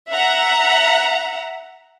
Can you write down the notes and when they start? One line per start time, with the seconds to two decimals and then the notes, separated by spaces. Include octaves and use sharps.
0.10 E5 F#5 A#5